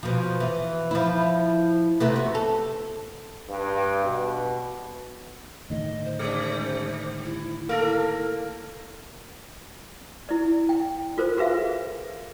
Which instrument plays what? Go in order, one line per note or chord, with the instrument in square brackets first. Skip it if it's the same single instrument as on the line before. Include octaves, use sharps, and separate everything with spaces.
[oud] B2 F3
E3
F3 E4
C3 A3 B3
F#4
A4
[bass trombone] G2
B2
[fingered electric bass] A2 D3 D#3 [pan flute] D#5
[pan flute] C5
[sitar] G3 C#4
[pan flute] E4
[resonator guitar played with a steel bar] A#3 [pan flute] E4 [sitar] A4 A#4
[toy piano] E4 D5
G5
F4 A4 A#4 C5
F#4 G#4 B4 E5 F5